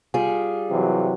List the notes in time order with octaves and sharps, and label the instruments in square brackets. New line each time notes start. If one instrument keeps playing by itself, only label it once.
[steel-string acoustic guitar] G3 F4 G#4
[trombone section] C3 E3 F#3